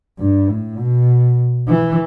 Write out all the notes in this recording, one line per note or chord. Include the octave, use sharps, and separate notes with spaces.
G2
A2
B2
E3